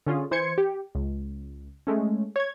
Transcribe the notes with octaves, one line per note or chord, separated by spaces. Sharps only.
D3 C#4 F4 G#4
E3 C5 C6 G#6 C#7
G4
C#2
G#3 A3 C#4
C#5 G#6